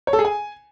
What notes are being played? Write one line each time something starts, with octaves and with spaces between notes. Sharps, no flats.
C#5
A4
G#4
G#5